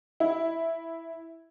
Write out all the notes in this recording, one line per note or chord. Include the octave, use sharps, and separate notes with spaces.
E4